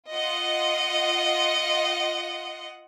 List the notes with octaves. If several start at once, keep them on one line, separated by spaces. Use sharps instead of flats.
F4 D#5 F#5